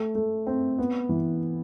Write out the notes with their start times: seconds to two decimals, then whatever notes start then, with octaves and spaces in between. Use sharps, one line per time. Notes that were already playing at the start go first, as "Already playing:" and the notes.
Already playing: A3
0.15 A3
0.47 C4
0.79 B3
1.09 E3